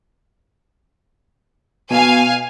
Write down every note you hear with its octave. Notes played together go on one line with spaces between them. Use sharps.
B2 F5 G#5